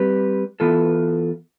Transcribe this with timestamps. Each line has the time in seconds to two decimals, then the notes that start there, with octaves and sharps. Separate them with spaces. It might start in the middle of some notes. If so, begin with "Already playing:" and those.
Already playing: G3 C4 G4 B4
0.60 E3 B3 F4 A4